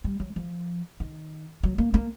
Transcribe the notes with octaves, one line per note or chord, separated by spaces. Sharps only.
G3
F#3
F3
D#3
F#3
A#3
A#3